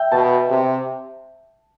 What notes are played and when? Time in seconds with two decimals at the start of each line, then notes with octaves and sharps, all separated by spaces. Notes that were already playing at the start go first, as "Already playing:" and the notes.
Already playing: E5 G5
0.12 B2 A5
0.50 C3